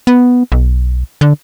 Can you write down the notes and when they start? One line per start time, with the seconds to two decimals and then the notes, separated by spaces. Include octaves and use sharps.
0.07 B3
0.52 B1
1.21 D3